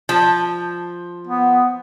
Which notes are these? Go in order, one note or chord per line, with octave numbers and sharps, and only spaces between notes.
F3
B3